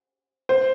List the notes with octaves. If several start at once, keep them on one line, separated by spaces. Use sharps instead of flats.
C5